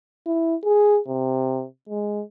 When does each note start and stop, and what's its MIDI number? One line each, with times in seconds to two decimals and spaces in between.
0.26 0.55 64
0.64 1.00 68
1.08 1.65 48
1.89 2.23 56